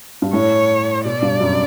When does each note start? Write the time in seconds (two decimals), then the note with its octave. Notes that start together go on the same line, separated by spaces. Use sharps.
0.22 G2
0.33 A2 C#5
1.05 B2 D5
1.22 G2
1.40 F#2